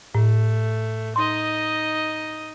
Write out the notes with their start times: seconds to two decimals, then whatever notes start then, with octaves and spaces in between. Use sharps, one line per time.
0.15 A2 A3
1.16 D#4 D#5 C6